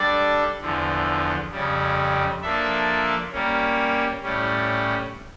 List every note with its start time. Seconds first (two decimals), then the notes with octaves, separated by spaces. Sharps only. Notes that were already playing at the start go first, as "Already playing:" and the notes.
Already playing: G3 D4 A4 D5
0.61 E2 D3 F3
1.52 F2 C#3 G3
2.42 F3 A#3 D4 A4 E5
3.32 G3 A#3 C#4
4.23 A2 G3 C#4